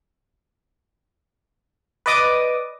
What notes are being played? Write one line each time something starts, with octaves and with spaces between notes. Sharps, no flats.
B4 D5 D#5 D6 D#6